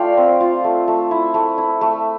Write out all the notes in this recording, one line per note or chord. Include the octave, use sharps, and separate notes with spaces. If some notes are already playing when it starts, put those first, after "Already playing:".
Already playing: A3 F4 D5 F5 G5
C4
F4
A3
A3
E4
A3
E4
A3